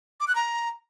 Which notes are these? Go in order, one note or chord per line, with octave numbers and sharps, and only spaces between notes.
D6
F#6
A#5